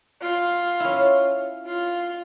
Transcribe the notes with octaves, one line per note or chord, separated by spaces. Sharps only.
F4
C#4 E4
F4